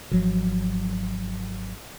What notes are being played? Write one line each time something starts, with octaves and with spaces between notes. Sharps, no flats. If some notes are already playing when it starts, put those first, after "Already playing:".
G#1 F3 F#3